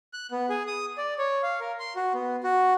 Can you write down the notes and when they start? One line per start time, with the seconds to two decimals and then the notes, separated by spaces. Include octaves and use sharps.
0.13 F#6
0.31 B3
0.50 G#4
0.67 D#6
0.98 D5
1.18 C#5
1.43 F5
1.60 A#4
1.79 C6
1.96 F#4
2.14 B3
2.43 F#4